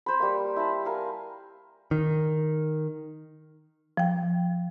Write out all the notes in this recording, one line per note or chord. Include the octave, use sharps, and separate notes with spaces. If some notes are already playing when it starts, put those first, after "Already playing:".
C5 B5
G3 A#3
E4 A5 B5
A#4 F5 G#5
D#3
F3 G5